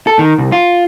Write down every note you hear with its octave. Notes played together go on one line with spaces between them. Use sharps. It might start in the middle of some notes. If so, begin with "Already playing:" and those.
A4
D#3
C2
F4